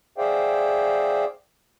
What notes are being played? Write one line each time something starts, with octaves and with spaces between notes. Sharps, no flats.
G#4 C5 D5 E5 F5 G5